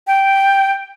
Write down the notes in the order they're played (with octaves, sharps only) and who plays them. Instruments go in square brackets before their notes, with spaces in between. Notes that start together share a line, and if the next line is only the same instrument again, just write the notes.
[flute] G5